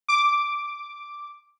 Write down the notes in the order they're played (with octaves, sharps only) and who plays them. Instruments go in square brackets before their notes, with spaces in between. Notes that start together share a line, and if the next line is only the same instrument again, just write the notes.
[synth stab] D6